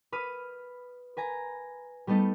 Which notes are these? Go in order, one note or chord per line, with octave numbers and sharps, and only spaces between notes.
B4 B5 D#6 F6
B4 G#5 A#5
G3 A3 B3 D#4 A4